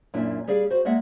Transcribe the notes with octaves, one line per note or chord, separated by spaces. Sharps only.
F#2 A#2 D4 E4
G3 G#4 D5 F5
F#4 C5
G#3 A#3 D5 E5 F#5